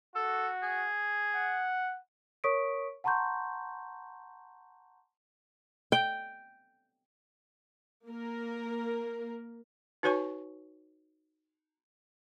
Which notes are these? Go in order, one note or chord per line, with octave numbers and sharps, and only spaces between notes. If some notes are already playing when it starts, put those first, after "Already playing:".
F#4 A4
G#4
F#5
A#4 C#5 C#6 D#6 B6 D7
F#5 A5 A#5 C6 C#6 G6
G5
A#3 A#4
D#4 F#4 B4 C#5 G#5 C#6